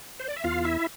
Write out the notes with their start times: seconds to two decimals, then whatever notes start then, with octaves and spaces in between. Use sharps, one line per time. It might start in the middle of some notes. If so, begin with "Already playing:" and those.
0.20 C5
0.28 D5
0.37 E5
0.44 E2 F4 F5
0.64 E4 E5